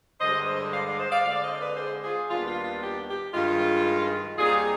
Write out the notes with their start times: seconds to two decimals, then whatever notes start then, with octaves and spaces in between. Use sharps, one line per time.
0.21 G2 D3 G#3 C5 D#5
0.47 C5 D#5
0.73 D5 F5
0.86 D5 F5
0.99 C5 D#5
1.12 D5 F5
1.25 D3 G#3 C4 D5 F5
1.36 D5
1.42 C5 D#5
1.60 B4 D5
1.77 G#4 C5
2.03 F4 G#4
2.30 D#2 D#3 G3 B3 D4 F4
2.48 F4
2.64 F4
2.82 G4
3.08 G4
3.34 G2 D#3 G#3 F4
4.38 D#2 D#3 G3 C4 D#4 F4 G#4